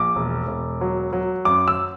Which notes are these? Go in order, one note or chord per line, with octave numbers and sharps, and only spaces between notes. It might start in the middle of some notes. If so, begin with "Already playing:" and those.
Already playing: A#1 D6
E1
E1
F#3
F#3
F#2 D6
E6